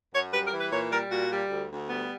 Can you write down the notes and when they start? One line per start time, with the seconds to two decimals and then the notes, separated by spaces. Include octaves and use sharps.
0.13 F#2 C#5
0.32 G3 B4
0.45 A#4
0.52 E3
0.58 B4
0.71 A#2 C#5
0.91 G3 A#4
1.10 A#2 F#4
1.30 G3
1.49 D2
1.69 D2
1.88 G3 B3